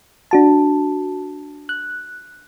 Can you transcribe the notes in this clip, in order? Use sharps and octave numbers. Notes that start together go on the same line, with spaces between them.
D4 F#4 A5
F#6